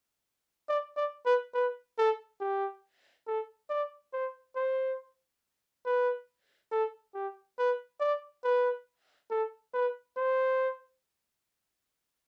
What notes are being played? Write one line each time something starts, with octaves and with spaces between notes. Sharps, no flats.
D5
D5
B4
B4
A4
G4
A4
D5
C5
C5
B4
A4
G4
B4
D5
B4
A4
B4
C5